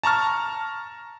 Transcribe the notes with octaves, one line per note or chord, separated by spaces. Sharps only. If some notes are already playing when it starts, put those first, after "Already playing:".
A5 A#5 C#6 F6